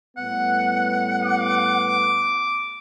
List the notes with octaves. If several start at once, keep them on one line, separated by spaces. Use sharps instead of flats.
A2 G3 B3 F#5
D6